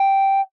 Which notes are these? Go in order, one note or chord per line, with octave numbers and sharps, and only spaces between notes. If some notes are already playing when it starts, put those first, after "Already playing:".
Already playing: G5